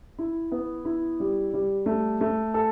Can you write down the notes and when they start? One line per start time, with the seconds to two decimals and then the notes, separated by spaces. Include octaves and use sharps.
0.19 E4
0.52 B3
0.85 E4
1.20 G3
1.53 G3
1.86 A3
2.21 A3
2.54 A4